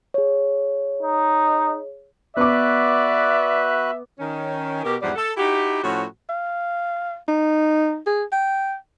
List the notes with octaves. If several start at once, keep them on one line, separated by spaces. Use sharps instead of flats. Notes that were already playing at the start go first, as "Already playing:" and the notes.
G#4 C#5
D#4
B3 F#4 B4 D5 E5 D6 F#6
D#3 C#4
B2 G4 A#4
E2 G#2 F3 G3 D5 F#5
A4
D#4 E4 F#4 G4
A2 F3 C#4 F#4
F5
D#4
G#4
G5